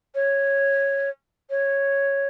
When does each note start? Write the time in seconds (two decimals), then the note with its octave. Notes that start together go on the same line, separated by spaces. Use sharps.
0.15 C#5
1.50 C#5